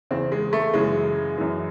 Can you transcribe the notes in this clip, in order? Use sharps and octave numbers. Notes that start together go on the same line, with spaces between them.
E2 C#3 E3 C4
G#3
A3
F#2 C#3 E3 G#3
F#2 E3